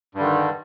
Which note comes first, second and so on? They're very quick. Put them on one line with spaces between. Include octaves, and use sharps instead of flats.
G2 G3 D3 D#3